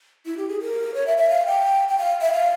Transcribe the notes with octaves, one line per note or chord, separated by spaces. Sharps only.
E4
G4
G#4
A#4
C#5
E5
E5
F5
G5
G5
F5
E5
F5